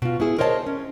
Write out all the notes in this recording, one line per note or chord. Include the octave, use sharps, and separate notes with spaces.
B2 F4
B3 E4 G#4
A#4 C5 C#5 D#5 F5 A5
C#4